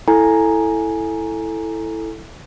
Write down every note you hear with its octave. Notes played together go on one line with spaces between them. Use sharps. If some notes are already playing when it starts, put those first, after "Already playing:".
E4 A4 G#5 A#5